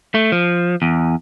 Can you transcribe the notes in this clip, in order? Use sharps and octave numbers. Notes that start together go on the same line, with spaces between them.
A3
F3
E2